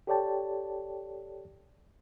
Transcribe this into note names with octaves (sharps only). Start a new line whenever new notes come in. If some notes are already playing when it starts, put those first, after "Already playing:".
G4 A4 C#5 D5 G5 A5